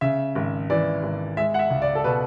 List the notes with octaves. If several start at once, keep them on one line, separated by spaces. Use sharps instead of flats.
C#3 E5
G#1
E3 D5
G#1
G#3 E5
F#5
E5
C#2
D5
A4
B2 B4